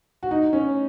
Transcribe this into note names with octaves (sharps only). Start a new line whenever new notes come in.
F#4
D#4
C#4